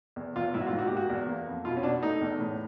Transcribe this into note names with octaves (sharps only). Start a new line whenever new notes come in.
E2
E2 F4
G#2 E4
F#4
F4
G#2
F#4
G4
A#3
F#4
E2
A#3
F2
B2 F4
C#4
B2 D4
A3 D#4
E2
A2